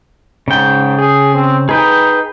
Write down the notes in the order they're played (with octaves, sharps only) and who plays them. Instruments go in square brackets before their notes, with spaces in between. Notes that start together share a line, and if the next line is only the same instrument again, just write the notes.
[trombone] G#2 [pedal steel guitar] C#3 G5
[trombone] G#4
C4
[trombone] D#4 [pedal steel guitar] G#4 B4 G5